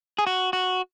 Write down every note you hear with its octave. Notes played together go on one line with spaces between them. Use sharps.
G#4
F#4
F#4